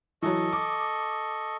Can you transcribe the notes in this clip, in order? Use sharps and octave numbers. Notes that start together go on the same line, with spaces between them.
E3 F#3 A4 D#5 C#6
D6